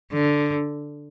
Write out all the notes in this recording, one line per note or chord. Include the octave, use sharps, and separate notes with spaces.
D3